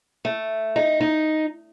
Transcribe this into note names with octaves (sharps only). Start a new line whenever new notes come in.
A3
D#4
D#4